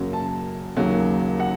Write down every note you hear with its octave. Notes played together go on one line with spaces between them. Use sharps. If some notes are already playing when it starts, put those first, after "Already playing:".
Already playing: F#2 C#3 F#3 A#3
A5
D#2 C#3 F#3 A#3
F#5